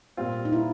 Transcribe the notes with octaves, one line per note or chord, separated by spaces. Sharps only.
A#2 G3 C4 F4
D#4
E4